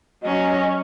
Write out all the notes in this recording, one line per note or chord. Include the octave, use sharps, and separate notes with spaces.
F#3 C#4 D#5